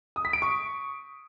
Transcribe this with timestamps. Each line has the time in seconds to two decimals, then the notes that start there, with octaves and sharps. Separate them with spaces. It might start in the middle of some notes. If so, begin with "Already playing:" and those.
0.16 D#6
0.25 B6
0.33 D7
0.42 C#6